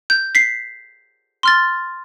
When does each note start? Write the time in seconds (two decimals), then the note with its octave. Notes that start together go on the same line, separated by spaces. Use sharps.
0.10 G6
0.35 B6 C7
1.43 C6 F6 A6